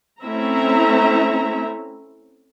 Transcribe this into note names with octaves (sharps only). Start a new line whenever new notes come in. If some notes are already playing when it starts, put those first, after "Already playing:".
A3 C4 C#4 E4 E5 A#5